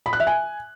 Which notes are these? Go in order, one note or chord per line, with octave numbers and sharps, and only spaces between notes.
B5
F#6
E5
G#5